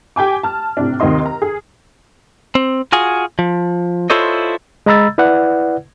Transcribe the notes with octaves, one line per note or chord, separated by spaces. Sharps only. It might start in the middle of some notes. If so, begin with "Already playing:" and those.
G4 G5 G#5 D6
A5 F6
A2 C3 D4
D#2 C3 D#3 D#5 C6
A#5
G#4
C4
F4 F#4 G#4 G#5
F3
E4 F4 A4 C5 C#5 D#5
G#3 D#5 A#5 B5 E6 A6
E4 B4 D5 F#5